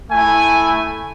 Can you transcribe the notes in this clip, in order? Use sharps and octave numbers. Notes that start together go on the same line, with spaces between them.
A3 E4 G#5